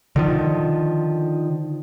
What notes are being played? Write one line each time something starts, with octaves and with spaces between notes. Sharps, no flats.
D3 D#3 F3